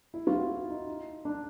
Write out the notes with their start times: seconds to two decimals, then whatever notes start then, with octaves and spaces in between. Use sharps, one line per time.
0.14 E4
0.27 F4
0.39 F#4
0.69 D#4
0.87 D#4
1.25 D4